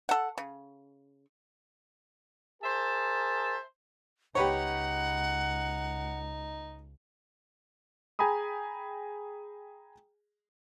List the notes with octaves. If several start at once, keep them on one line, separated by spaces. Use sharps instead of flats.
A4 F#5
C#3
G#4 A#4 C5 E5 A5
C#2 D#4 G4 B4 C#5 F#5
G#4 G5 G#5 A#5 B5 D#6